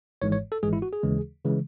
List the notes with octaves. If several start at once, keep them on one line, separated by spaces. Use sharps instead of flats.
G#1 G#2 E3 G#3 C#5
C#5
A4
G#1 G#2 E3 G#3 G#4
E4
F#4
G#4
D#2 C#3 E3 G#3
C#3 E3 G#3